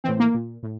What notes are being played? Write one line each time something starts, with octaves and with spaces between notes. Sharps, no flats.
A2 E3 C4
A#3
A#2
A2